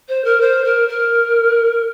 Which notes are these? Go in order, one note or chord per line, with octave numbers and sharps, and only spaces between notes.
C5
A#4
C5
A#4
A#4